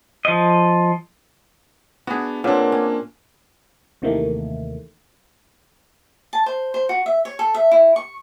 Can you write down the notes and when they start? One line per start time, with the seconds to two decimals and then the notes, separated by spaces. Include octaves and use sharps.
0.25 F3 D#5
2.07 B3 D4 F#4 G#4
2.44 A#2 A#3 C4 D4 B4 C#5 F#5
2.72 C#4
4.02 D#2 C3 D#3 E3 A3 A#3
6.33 A5
6.46 C5
6.74 C5
6.89 F#4
7.06 E5
7.25 C#5
7.39 A4
7.55 E5
7.71 E4
7.96 C#6